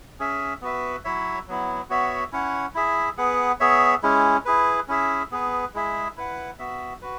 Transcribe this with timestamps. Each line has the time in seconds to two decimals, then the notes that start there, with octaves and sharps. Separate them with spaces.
0.19 C#4 G#4 E5
0.62 B3 F#4 B4 E5
1.05 F#3 E4 C#5 E5
1.48 F#3 B3 E4
1.90 B3 F#4 C#5 E5
2.32 C#4 E4 C#5 F#5
2.75 E4 G#4 E5
3.18 B3 G#4 B4 F#5
3.60 B3 G#4 C#5 E5
4.03 G#3 C#4 E4
4.45 E4 G#4 B4
4.88 C#4 E4 G#4 E5
5.31 B3 G#4 B4
5.74 G#3 E4 G#4 E5
6.17 E4 B4 F#5
6.59 B3 F#4 E5
7.02 F#4 B4